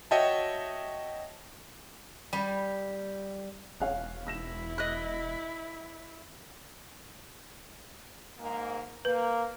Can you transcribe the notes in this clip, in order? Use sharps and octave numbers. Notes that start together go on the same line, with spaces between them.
F#4 C#5 D#5 E5 G5 A5
G3
E1 C#5 F5 F#6
E4 E6 A#6 E7
D#5 F#6
G#2 A#3
A#3 B4